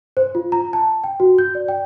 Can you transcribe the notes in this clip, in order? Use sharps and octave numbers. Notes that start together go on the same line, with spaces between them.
C5
F4
A#5
A5
G5
F#4
G6
D5
G5